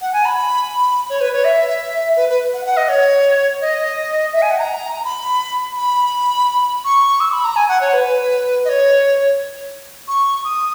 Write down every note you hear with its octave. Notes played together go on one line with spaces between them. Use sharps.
F#5
G#5
B5
C#5
B4
C#5
E5
B4
B4
F#5
F#5
D#5
C#5
D#5
E5
G#5
F#5
A#5
B5
B5
C#6
E6
B5
A#5
G#5
F#5
C#5
B4
D#5
C#5
C#6
D#6